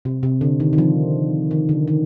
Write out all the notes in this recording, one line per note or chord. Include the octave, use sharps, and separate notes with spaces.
C3
C3
D3
D#3
D#3
F3
D#3
D3
D#3